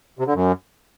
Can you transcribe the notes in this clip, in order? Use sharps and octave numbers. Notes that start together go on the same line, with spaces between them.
C3
D3
F#2